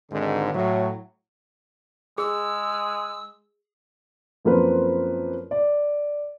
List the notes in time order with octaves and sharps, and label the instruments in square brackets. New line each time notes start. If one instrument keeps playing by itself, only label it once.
[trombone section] G#1 G#2 D3
A2 F#3
[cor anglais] G#3 [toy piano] G#4 [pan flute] E6
[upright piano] F#2 F3 A#3 C4 B4
D5